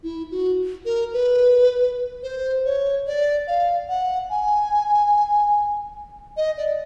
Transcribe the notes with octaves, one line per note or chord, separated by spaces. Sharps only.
E4
F#4
A#4
B4
C5
C#5
D5
F5
F#5
G#5
D#5
D5